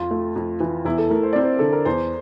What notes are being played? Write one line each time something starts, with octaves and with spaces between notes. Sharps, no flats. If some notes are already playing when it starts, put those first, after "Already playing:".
Already playing: F2 F4
A3
F2
E3
E2 E4
A4
A3 A#4
C5
C4 D5
C5
D3 A4
A#4
E2 C5